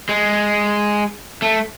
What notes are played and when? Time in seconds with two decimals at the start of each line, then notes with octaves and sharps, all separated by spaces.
0.09 G#3
1.42 A3